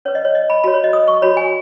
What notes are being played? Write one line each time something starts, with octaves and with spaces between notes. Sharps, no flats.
C#4 B4 C#5
D#5
C#5
D#5
B5
F#4 C#5 B5
C#5
D#5
D#6
C#6
F#4 C#5 B5
G#5